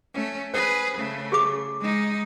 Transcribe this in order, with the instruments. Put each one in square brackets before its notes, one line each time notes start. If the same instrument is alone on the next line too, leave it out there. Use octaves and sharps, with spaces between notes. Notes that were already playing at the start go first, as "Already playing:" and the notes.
[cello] A3 C#4
[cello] G#4 B4 [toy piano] C5
[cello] C#3 A3
[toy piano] G4 G#4 D6
[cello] G#3 D#4